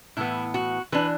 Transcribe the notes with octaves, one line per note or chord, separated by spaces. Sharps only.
A2 E3 B3 E4
F#4
E3 D4 B4